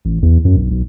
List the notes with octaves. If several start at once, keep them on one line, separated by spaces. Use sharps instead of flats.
A1
E2
F#2
B1
B1